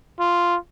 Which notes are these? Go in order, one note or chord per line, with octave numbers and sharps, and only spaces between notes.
F4